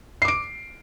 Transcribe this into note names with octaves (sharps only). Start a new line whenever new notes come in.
D6 C7 D7